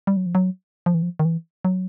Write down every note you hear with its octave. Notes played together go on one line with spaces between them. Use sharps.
G3
F#3
F3
F#3
F3
E3
F3
D#3
E3
F#3